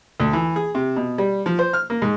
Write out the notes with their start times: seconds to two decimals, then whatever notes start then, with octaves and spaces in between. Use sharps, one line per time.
0.20 D2
0.33 E3
0.56 G#4
0.75 C3
0.96 B2
1.18 G3
1.46 F3
1.59 C5
1.73 F6
1.90 A#3
2.02 G#2